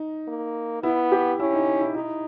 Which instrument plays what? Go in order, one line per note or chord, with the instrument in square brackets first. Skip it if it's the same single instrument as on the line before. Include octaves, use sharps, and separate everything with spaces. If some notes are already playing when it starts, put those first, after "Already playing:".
Already playing: [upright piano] D#4
[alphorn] A#3
[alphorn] B3 [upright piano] E4
[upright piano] G4
[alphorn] C#4 [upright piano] E4
[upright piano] D#4
E4
[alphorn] D#4 [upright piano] E4